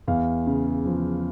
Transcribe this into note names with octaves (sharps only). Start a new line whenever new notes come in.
E2 F5
C#3
F3